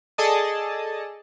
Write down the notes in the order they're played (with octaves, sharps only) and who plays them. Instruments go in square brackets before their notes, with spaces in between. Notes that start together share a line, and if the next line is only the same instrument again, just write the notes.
[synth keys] G#4 A4 D5 D#5 A5 D#6